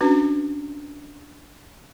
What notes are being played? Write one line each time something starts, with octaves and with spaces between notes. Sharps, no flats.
C#4 D4 F#4 B4